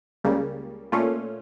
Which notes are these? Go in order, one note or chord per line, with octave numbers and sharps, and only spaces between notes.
C#2 C#3 G3 A#3
A#2 A3 C#4 F4